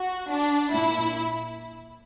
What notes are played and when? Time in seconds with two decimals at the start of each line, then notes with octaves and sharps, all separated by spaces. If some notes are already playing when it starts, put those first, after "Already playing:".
Already playing: F#4
0.31 D4
0.72 A#2 E4